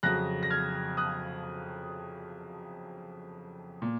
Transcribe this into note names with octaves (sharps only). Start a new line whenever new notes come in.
F2 C#3 F#3 F#6 A#6
A#6
F6 G#6
D#6 F#6
A#2